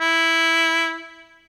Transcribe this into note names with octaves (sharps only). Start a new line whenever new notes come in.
E4